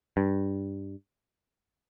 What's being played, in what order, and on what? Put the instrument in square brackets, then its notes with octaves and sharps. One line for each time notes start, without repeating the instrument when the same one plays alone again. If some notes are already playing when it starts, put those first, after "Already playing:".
[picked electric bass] G2